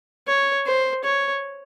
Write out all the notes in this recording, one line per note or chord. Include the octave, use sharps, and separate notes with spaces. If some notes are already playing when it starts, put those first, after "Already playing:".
C#5
C5
C#5